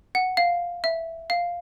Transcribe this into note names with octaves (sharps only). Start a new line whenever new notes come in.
F#5
F5
E5
F5